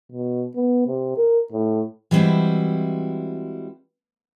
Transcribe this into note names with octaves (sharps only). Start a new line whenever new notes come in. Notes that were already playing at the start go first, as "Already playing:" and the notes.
B2
B3
C3
A#4
A2
E3 G3 G#3 C4 E4 F#4